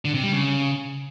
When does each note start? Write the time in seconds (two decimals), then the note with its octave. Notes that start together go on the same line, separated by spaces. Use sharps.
0.05 D3
0.14 C3
0.23 G3
0.32 C#3